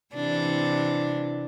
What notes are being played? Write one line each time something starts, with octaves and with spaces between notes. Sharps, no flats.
C3 E3 D4